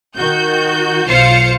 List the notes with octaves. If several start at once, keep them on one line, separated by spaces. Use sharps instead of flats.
D#3 F#4 G6
B1 F4 C5 F5 C#7